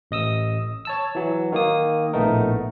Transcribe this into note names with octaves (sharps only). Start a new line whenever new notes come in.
A1 D#5 D#6 E6
C#5 A5 E6
E3 F#3
D#3 A#3 D#6
A#1 A2 A3 B3 D#4 A#4